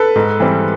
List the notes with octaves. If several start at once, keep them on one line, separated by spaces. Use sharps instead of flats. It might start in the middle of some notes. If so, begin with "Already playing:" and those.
Already playing: A4 B4
G#2
E3 G3 C4